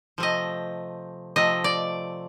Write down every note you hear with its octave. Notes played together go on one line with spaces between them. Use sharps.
C3 F3 A3 D#5
C3 F3 A3 D#5
D5